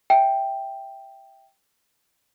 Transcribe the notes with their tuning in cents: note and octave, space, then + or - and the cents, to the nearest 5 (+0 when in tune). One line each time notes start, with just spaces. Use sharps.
E5 +0 G5 +0